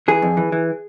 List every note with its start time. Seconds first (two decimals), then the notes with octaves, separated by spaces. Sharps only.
0.08 E3 G#4
0.22 F2
0.37 E3
0.52 E3